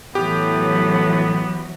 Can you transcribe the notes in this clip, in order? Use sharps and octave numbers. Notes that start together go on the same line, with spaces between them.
A2 E3 F#3 B3 G4